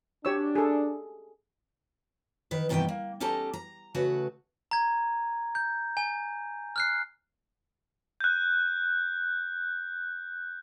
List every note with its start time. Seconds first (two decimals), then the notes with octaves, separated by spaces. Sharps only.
0.25 D4 G4 C#5 E6
0.55 G#4 A4
2.51 D#3 B4
2.69 G2 C3 D#3 E3 B3 G5
2.89 A#3
3.20 C#4 D#4 G4 A4 A5 A#5
3.53 A#5
3.94 C#3 A3 F#4 B4
4.71 A#5 G#6
5.55 G6
5.97 G#5
6.76 F6 F#6 C7
8.21 F#6 G6